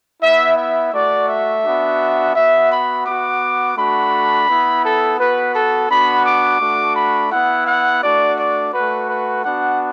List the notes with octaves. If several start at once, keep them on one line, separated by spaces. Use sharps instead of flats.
B3 E4 E5
E5
A3 F#4 D5
E5
B3 D4 F#4
B3 F#4 E5
B5
B3 F#4 D6
A3 D4 F#4 B5
B3 E4
A4
B3 F#4 B4
A4
B3 D4 F#4 B5
D6
A3 D4 F#4
B5
B3 E4 F#5
F#5
A3 D4 F#4 D5
D5
A3 F#4 B4
B4
B3 D4 F#4 F#5